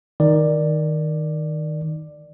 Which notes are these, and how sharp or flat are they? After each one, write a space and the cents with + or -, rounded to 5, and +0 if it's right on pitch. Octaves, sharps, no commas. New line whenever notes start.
D#3 +0 D5 +10